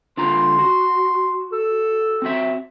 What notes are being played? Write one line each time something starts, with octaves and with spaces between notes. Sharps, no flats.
D3 F4 A#5 C6
F#4
A4
C4 F#4 E5